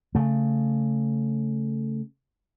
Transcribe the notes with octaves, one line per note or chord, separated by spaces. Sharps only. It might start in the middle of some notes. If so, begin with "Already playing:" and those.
C#3 A3